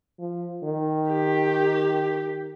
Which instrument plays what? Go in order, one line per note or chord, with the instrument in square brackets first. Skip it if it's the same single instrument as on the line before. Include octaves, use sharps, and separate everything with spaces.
[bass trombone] F3
D#3
[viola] G4